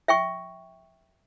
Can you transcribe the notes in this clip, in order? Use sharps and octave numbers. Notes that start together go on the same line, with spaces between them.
E5 G5 C#6